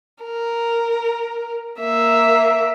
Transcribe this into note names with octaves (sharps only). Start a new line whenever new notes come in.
A#4
A#3 E5